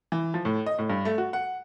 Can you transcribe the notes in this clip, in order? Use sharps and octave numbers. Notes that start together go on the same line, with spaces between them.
E3
F3
A2
D#5
A2
G2
A3
F#4
F#5